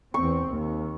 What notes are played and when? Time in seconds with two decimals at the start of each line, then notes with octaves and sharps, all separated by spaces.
0.14 E2 C4 C#6
0.49 D#2